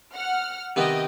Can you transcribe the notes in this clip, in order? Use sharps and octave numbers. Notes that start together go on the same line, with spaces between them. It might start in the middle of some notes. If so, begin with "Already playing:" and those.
F#5 F6
C3 D#3 B3 D#5 G5